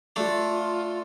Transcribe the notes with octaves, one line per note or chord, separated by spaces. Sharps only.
A3 D4 F4 G4